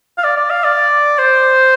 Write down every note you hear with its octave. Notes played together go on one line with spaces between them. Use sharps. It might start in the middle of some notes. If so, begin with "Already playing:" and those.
F5
D5
D5
F5
D5
C5